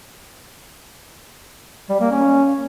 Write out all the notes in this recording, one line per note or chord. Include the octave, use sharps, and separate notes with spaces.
G3
A#3
C#4